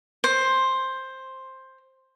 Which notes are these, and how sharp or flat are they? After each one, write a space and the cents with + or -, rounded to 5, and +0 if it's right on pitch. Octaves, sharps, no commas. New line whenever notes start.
C5 +10